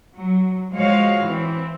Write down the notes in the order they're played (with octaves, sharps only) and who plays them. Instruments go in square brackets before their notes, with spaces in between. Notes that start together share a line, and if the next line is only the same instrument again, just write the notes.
[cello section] F#3
F3 G#3 F#4 C#5 F5
E3 C4